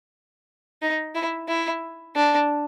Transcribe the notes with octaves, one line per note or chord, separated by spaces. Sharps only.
D#4
E4
E4
D4